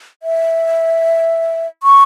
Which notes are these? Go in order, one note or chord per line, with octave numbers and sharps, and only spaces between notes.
E5
C#6